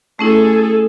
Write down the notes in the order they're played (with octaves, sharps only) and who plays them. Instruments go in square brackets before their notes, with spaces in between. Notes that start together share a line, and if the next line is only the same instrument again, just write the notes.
[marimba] A3 C#4 E4 [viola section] G#4 A4